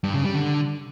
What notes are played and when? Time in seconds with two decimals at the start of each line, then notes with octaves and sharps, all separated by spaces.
0.04 G2
0.14 C#3
0.24 G3
0.35 D3